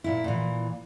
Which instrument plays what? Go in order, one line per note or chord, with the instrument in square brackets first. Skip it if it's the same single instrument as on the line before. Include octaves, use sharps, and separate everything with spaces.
[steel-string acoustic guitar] A#2 E4
A#2 E3